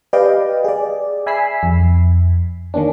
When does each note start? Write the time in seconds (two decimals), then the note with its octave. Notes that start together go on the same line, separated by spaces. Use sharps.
0.13 G4 B4 D5 D#5 F5 G5
0.64 G#4 D5
1.26 E5 G#5 B5 E6 B6 C7
1.63 F2
2.74 D#3 A#3 C#4 D4